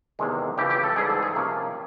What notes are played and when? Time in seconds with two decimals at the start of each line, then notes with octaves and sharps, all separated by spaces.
0.19 E2 C3 D#3 G#3
0.58 C#2 C#3 E3 G4
0.70 G4
0.83 A4
0.96 G#2 E3 G3 G#4
1.10 A4
1.23 G#4
1.35 C3 F3 A#3 C#4